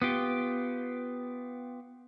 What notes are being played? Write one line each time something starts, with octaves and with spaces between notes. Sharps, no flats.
B3 F4 G4